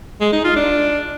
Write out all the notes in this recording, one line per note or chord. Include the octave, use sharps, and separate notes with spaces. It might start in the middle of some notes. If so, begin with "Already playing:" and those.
G#3
D#4
F4
D4